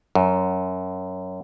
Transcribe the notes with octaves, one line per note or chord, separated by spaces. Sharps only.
F#2